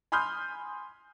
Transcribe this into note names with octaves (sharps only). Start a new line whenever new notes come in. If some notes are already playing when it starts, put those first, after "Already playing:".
G#5 B5 C6 D#6 F6 G6